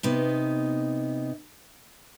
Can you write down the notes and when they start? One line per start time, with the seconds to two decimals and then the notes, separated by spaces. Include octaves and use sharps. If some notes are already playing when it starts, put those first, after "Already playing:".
0.03 C3 B3 D#4